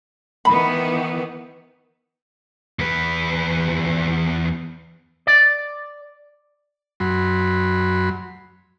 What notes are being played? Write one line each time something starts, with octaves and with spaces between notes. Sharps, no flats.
D#3 E3 B3 B5
E2 B4
D5
F#2 F#3 B5 C6